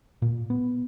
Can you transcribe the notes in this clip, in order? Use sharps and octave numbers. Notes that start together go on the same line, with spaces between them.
A#2
B3